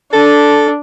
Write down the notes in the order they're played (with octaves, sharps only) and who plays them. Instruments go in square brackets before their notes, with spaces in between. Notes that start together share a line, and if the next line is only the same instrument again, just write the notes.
[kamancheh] D4 [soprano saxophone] A4